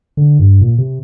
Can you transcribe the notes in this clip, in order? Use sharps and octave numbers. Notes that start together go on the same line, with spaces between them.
D3
G2
A#2
C3